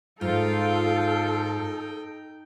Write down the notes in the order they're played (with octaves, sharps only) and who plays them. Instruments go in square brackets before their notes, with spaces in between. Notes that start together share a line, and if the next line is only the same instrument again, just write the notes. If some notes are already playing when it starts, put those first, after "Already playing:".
[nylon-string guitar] G#2 [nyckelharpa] D#4 G5 [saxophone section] F4 [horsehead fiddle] A4